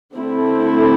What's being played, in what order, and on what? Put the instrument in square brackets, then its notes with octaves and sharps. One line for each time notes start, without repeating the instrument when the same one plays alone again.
[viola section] D3 A3 C4 E4 A4